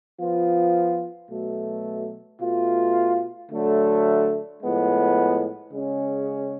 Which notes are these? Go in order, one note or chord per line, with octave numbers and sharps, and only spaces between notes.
F3 B3 F4
B2 F#3 A3
B2 A3 F4
D3 F#3 A3
A2 F3 G#3 B3
C#3 G#3 C#4